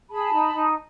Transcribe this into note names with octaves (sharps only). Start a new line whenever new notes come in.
G#4 A5 B5
D#4
D#4